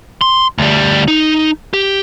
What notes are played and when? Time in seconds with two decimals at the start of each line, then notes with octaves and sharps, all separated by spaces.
0.21 C6
0.58 D2 G3
1.08 D#4
1.74 G4